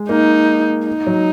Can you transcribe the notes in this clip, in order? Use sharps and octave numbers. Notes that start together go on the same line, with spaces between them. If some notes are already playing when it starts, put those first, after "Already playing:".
Already playing: G#3
A#3 D#4
D#4
F#3